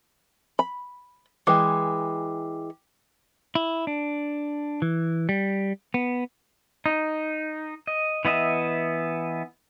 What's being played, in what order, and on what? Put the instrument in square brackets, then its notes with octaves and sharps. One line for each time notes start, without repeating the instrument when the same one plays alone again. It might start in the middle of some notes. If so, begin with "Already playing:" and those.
[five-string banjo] B5
[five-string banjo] E3 G#3 [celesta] G5 D6
[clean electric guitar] E4
D4
E3
G3
B3
[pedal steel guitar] D#4
D#5
E3 B3 D#5 E5